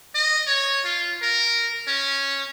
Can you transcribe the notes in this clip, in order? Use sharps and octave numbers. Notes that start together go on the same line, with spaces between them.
D#5
C#5
F4
A#4
C#4